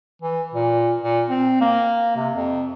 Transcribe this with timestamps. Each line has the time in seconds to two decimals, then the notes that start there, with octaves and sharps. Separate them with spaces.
0.22 E3
0.54 A#2
1.01 A#2
1.29 C4
1.61 A#3
2.16 C3
2.34 F2